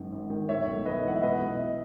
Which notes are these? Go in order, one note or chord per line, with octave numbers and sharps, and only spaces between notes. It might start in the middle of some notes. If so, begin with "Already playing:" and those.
Already playing: G#1 F#2 D#3
G#1
D#3
A2 C#5 E5
B1
B1 B4 D#5
E3 F#5
E5
B2 B4 D#5
B2